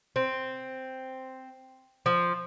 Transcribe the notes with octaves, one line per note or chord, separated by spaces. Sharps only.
C4
F3